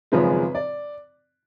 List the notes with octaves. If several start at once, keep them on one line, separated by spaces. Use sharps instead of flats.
G#1 F#2 C#3 F3 G#3 B4
D5